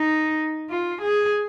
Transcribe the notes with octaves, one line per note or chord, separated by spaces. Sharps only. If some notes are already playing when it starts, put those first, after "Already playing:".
Already playing: D#4
F4
G#4